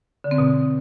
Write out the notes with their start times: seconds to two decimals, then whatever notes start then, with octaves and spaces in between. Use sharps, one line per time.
0.24 D3
0.31 C4
0.38 B2